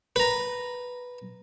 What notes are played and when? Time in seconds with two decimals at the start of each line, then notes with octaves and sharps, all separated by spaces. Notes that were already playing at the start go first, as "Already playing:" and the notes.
0.16 B4 A#5